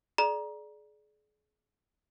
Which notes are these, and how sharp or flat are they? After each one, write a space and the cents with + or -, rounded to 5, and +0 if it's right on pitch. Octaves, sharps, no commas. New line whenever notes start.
G#4 +35 D5 +0 A#5 +25